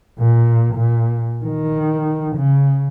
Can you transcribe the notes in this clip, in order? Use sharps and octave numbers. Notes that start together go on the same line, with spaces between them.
A#2
A#2
D#3
C#3